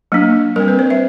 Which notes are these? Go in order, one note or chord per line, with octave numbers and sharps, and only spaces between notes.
F#3 A#3 D4
G3 C4 A#4
B4
C5
E5